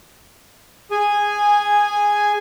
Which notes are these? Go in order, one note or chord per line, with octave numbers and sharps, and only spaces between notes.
G#4 G#5